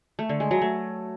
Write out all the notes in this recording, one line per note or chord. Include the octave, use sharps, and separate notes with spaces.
A3
D3
G#3
F#3
A3